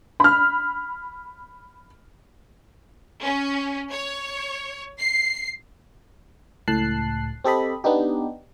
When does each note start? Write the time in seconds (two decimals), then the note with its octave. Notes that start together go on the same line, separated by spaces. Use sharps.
0.20 B5 F6
3.23 C#4
3.92 C#5
5.00 C7
6.68 C#2 A2 A5 F#6 C7
7.44 C4 G4 A4 D#5 B5
7.84 B3 D4 D#4 G4